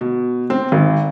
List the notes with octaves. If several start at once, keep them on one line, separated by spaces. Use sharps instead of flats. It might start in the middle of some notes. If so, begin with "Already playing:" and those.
B2
C4
G#1